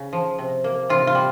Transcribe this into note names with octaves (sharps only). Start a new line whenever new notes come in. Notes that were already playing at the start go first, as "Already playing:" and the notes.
Already playing: C#3
F3
C3
A#3
C3 F4
F4
G3